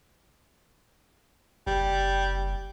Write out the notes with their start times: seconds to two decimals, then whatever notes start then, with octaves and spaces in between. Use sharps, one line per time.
1.67 F#1 G3